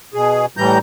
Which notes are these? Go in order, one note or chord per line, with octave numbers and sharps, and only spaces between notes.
B2 G#4
A2 E3 G3 A#5 G6